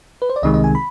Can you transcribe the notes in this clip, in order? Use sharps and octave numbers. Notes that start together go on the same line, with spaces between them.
B4
C5
D5
C2 C3 D#3 G#3 D#5
D#5
G#5
B5